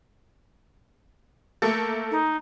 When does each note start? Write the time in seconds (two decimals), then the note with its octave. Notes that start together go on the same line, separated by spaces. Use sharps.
1.62 A3 A#3 A4
2.11 D#4